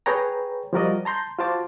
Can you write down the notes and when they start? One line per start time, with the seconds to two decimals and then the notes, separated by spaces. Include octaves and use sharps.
0.06 G#4 B4 C#5 G5 A#5
0.73 F3 G3 F#4 A#4 D5 D#5
1.05 A5 A#5 C6 G6
1.39 F4 F#4 C5 A5 D6